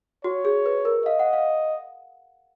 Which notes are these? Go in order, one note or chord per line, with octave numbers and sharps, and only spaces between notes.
F#4 C#5
G#4
B4
A#4
D#5 F5
F#5
F5